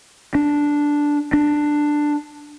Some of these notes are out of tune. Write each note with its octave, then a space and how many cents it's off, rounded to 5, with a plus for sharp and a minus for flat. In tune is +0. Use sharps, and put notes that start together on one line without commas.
D4 -5
D4 +10